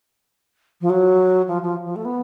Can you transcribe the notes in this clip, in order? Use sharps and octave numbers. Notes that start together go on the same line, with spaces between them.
F3
F#3
F3
F3
F3
A3
B3